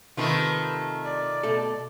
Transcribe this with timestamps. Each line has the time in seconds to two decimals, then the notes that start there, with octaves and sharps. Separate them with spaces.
0.17 C3 D#3 A3 F4 B4
1.04 D5
1.43 B2 A3 A4